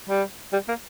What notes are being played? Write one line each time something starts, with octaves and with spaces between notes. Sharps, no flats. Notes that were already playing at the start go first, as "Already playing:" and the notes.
G3
G3
A#3